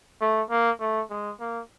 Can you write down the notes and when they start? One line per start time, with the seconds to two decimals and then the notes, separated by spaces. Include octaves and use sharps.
0.21 A3
0.50 A#3
0.80 A3
1.10 G#3
1.40 A#3